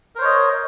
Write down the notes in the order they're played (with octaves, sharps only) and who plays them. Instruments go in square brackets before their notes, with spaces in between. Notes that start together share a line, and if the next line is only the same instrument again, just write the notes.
[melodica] A#4
C5
C#5
D#5